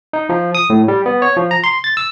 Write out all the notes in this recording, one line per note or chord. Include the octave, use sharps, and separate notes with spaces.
D#4
F3
D#6
A2
G3
B3
C#5
F3
A#5
C6
A6
E6